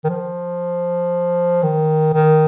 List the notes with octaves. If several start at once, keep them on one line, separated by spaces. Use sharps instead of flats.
D#3
F3
D#3
D#3